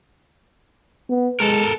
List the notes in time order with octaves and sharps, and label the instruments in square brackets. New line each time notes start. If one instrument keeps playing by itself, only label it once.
[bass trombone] B3
[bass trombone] G#3 [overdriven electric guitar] A4 A#4